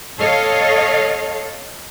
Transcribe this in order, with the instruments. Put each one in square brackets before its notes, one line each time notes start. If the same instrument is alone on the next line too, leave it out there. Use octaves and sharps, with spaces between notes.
[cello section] A4 C#5 D#5 F5